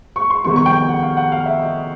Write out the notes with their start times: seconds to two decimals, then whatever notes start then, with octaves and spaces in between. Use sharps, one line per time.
0.16 C#6
0.30 C6
0.44 F2 C3 D#3 G3 B3 C#6
0.56 C#6
0.66 G5
0.77 G5
0.89 F#5
1.03 F5
1.17 F#5
1.32 F5
1.46 E5
1.60 D#5